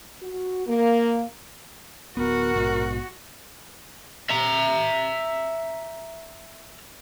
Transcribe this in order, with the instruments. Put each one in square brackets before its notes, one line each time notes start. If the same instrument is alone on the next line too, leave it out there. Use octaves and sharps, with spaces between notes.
[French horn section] F#4
A#3
[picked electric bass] D1 B3 [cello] F#4 [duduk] A#4
[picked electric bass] A#1 G#2 B2
[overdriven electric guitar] E5 A#5